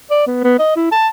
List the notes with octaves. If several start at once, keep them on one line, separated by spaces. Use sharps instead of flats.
D5
B3
B3
D#5
E4
A5